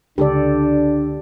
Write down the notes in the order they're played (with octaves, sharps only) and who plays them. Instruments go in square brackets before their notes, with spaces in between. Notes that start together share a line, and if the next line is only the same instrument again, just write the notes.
[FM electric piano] C#2 [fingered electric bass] D3 [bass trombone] D4 [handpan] G4 A4 D5